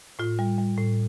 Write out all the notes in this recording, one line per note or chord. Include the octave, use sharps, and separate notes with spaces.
A2 F4
G3
G3
A2